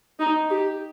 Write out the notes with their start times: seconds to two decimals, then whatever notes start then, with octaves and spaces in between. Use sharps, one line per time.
0.19 D#4
0.50 G4